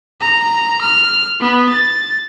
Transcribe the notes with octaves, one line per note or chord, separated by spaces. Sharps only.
A#5
F6
B3
A6